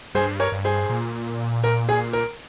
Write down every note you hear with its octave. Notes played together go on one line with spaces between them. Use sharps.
G2 G#4 C5
A#4 C#5
G2
G#4 C5
A#2
A#4
G#4
A#4